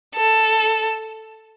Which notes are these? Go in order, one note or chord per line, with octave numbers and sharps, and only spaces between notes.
A4